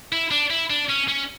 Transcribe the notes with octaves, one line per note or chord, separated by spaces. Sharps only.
E4
D4
E4
D4
C#4
C#4